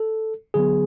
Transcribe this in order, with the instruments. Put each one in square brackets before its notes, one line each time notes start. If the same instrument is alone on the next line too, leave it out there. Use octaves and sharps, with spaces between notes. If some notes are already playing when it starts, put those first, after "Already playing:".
Already playing: [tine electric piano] A4
D3 F#3 B3 G#4